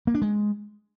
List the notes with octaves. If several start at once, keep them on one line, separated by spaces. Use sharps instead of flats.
A#3
D4
G#3